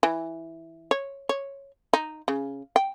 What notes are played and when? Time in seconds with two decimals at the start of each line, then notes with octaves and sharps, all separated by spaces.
0.03 E3
0.91 C#5
1.29 C#5
1.93 D#4
2.28 C#3
2.76 G5